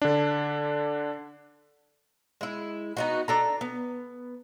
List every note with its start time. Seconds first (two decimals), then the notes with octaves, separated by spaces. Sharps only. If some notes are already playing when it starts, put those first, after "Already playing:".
0.02 D3 D4
2.41 G#3 E4
2.97 B3 D#4 F#4
3.28 D4 A4 A#5
3.61 B3